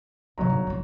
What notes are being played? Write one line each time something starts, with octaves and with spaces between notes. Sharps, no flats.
G1 F2 C3 F#3 A#5
G#2
F1 F4